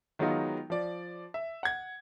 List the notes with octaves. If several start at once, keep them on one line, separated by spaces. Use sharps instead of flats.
D#3 F#3 G#3 B3 D#4 F4
F3 D5
E5
F#5 G#6